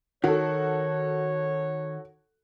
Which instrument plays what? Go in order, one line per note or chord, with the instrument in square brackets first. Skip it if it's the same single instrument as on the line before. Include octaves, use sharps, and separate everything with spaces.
[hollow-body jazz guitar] D#3 [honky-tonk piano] F#4 A4 [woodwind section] C#5